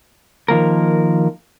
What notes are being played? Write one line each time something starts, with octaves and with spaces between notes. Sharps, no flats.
D#3 F3 A#3 A#4